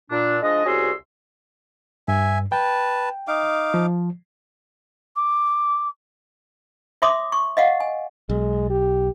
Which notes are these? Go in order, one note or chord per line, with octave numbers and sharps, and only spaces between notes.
A#2 D4
F3 G#3 D4 D#5
C2 C#4 F#4 G#4 C6 E6
G2 E5 G#5
B4 G5 A5
D#4 F5 D6
F3
D6
C#5 E5 C6 D6 D#6
C#6
D#5 F5 F#5
G#5
B1 G#3
G4